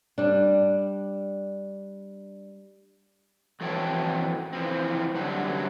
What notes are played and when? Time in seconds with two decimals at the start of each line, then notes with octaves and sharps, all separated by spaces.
0.18 G3 D4
3.61 F2 E3 F#4 A4 C#5 G5
4.53 E3 F3 C4
5.15 F#2 D3 F#3 G3